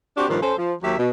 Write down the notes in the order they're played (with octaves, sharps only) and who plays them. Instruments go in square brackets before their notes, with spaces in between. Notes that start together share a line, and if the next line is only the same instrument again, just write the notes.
[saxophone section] C4 D4 F#4 G4
G2 A#2 D#3 F3
C#4 A4 C5
F3
D#2 F#3 G4 E5
B2